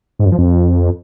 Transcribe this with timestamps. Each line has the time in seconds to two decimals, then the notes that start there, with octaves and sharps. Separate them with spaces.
0.19 G#2
0.26 F#2
0.32 F3
0.38 F2